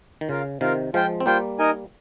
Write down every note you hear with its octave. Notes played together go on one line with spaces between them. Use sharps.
D#3
C#3 F4 A#4 F5
C3 D#3 F4 A#4 F5
F3 G#3 F4 C5 G5
C4
G3 A#3 F4 C5 G5
D#4 A#4 D#5 G#5